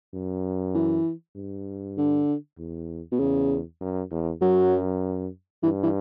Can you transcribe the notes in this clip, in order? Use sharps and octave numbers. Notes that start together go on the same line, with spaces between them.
F#2
E3
G2
D3
E2
B2
E2 C#3
F#2
E2
F#2 F#3
G2 E3
E3